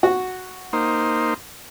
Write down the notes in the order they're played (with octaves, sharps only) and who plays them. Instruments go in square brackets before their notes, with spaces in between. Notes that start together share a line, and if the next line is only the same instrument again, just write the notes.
[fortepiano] F#4
[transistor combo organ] A#3 D#4 C5